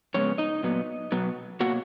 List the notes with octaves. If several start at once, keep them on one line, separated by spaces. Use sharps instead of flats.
F2 C#3 G#3 B3 C#4 C#5
D#4 D#5
A#2 F#3 B3
B2 F#3 B3
B2 F#3 A#3 F#4 F#5